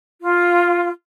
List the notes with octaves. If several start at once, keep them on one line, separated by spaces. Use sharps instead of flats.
F4